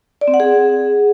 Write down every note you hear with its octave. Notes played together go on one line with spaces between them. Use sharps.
D5
C4
F#5
G#4